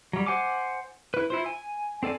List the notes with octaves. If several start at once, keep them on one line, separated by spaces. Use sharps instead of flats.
F#3 G3
C5 F#5 G#5 D6
E4 B4
E4 F4 C5
G#5
C4 A4 D5 G#5